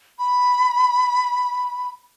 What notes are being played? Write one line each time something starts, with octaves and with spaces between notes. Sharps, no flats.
B5